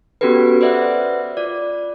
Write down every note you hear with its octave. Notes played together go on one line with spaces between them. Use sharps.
B3 C#4 F#4 G4 A4 B4
B4 C5 D5 E5 F#5
F4 D5